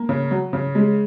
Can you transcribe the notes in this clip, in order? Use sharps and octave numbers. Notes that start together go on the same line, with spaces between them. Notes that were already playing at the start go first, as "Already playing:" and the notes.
Already playing: A#3
C#3
F#3
C#3
G#3